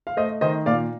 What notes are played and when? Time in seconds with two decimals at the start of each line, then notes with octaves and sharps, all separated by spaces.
0.07 F5
0.17 A3 C5 D#5
0.41 D#3 C5 D#5
0.66 A#2 D5 F5